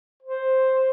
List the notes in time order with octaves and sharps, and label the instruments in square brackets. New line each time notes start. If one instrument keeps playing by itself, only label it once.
[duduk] C5